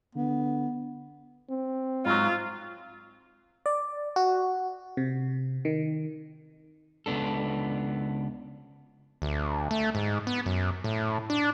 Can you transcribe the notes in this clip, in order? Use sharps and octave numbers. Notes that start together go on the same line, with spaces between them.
D3 B3
C4
G#2 F#3 F4
D5
F#4
C3
D#3
C#2 B3 D4 A4
D2
A3
G#2
B3
F#2
A2
D4